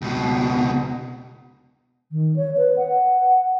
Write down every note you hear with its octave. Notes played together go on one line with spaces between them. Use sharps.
C#2 B2
D#3
C#5
B4
F#5